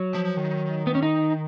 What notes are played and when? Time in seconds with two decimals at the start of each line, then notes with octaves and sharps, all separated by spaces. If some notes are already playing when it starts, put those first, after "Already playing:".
Already playing: F#3
0.15 F3
0.37 D#3
0.87 B3
0.95 C#4
1.03 D#4